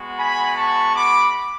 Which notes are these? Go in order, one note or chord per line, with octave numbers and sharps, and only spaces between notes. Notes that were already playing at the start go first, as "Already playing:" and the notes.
Already playing: G#3 B3 F#4
G#5 B5
A5 C#6
B5 D6